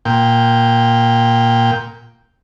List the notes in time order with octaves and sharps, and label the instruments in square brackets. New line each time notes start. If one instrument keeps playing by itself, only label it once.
[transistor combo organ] A#2 G5